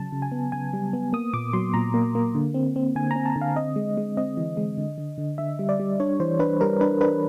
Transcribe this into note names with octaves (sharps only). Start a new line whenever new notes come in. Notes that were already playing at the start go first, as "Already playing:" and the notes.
Already playing: C#3 F#3 A5
C#3
G#5
B3
C#3 G#5
G3
B3
A#3 D#6
A#2 D6
F#3 C6
A#2 A#5
A#3
A#3
D3
C4
C4
D3 G#5
A#5
C4
A5
D3
F5
C4 D#5
G#3
G#3
C4 D#5
E3
G#3
D3
D3
D3
D3 E5
G3
D5
G3
D4 C#5
E3 C5
D4 B4
G3 A#4
D4 B4
D4 B4